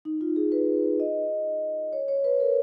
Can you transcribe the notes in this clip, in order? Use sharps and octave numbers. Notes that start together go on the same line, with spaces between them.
D#4
F4
G#4
B4
D#5
C#5
C#5
B4
A#4